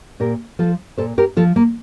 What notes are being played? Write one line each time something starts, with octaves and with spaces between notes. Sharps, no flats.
A#2 G4 A#4
F3 F4 A4
A#2 A4 C5
G4 A#4
F3 F4 A4
A#3